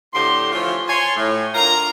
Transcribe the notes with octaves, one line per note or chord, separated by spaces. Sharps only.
A2 D3 G4 C5 C6
E3 F3 A3 F4 C#5
C#5 G#5 A5 C6
A2
D3 F4 A#4 F5 A#5